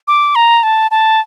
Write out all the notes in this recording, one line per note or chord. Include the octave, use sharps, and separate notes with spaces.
D6
A#5
A5
A5